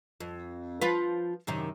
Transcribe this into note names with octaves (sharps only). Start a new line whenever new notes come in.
F2
F3 F4 B4
F#2 C3 D#3